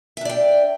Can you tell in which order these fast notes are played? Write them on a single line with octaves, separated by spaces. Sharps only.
E5 D4 D5 G5